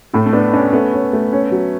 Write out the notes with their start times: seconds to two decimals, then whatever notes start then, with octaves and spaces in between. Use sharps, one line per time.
0.13 A2 A3
0.26 A3
0.33 B3 D4
0.53 C#4 D4
0.73 A3 B3
0.93 C#4
1.13 A3
1.33 C#4
1.52 F#3